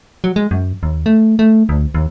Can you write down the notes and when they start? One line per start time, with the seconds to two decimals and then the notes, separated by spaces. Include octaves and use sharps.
0.24 F#3
0.36 G#3
0.51 F#2
0.83 D#2
1.06 A3
1.39 A3
1.69 D2
1.95 D#2